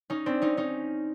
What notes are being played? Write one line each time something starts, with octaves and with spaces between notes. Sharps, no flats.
C#4 D#4
C4 D4
C#4 D#4
C#4 D#4